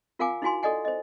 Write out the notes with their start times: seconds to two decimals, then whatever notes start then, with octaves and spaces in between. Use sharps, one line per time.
0.19 F4 A#4 F5 F#5 G#5 D6
0.42 D#4 E4 F#4 G#5 C6
0.63 A4 D5 D#5 F#5 G#5
0.85 C5 D#5